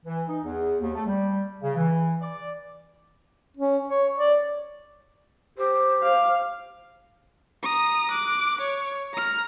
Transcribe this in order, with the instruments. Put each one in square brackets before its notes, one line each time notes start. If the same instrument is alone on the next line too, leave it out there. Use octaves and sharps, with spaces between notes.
[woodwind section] E3
D#4
E2
D#2
A3
G3
C#3
E3
D5
[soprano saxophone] C#4
C#5
D5
[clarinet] G4 [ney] C5
[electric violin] F5 [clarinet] D6
[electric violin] A#5 D#6
D6 F#6
C#5
A#5 F6